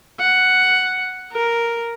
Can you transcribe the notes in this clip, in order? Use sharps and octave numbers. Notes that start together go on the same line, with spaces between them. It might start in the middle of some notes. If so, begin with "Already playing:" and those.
F#5
A#4